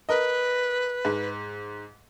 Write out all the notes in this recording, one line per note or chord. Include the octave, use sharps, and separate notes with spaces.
A#4 B4 D#5
G#2